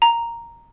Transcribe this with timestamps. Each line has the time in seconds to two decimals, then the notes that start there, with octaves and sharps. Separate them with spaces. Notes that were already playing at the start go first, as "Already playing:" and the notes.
0.02 A#5